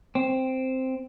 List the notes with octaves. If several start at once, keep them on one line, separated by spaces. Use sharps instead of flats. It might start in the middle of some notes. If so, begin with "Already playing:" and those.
C4